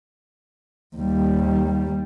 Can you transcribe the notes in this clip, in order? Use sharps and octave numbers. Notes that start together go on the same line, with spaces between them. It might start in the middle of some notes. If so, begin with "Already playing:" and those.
D#2 G3